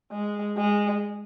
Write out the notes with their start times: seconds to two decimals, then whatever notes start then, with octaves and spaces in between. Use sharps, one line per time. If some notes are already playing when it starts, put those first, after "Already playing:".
0.11 G#3
0.57 G#3